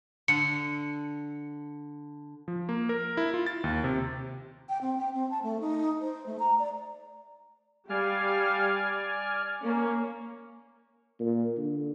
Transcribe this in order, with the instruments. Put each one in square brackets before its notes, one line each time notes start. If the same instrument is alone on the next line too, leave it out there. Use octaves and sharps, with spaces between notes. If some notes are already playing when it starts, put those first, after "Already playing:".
[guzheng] D3 [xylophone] C#7
[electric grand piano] F3
A#3
A#4
E4
F4
A6
D#2
C3
[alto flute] G5
C4
G5
C4
A5
A3
D#4
C5
A3
A#5
D5
[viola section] G3 F5 [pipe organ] D5 G#5 F6
[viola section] A#3 C#4
[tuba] A#2
D3